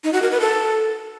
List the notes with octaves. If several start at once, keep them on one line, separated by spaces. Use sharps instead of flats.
D#4
F#4
A#4
B4
A4